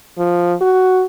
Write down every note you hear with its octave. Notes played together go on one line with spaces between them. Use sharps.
F3
F#4